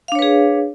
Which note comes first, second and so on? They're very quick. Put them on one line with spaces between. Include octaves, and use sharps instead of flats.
F5 D4 C#5 B4 G#4